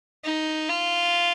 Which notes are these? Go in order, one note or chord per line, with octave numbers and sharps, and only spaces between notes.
D#4
F4